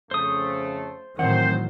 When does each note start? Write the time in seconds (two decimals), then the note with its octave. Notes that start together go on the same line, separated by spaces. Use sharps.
0.11 F2 C#3 A3 C5 D#6
1.19 A2 D#3 E3 F#3 C4 A#4 C5 F#5